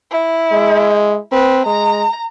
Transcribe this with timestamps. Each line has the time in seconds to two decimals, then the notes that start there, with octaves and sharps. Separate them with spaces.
0.11 E4
0.52 G#3
1.32 C4 B4
1.66 G#3 A#5